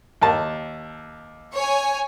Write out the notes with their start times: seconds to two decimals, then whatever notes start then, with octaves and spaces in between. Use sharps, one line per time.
0.22 D#2 A5
1.55 C#5 G#5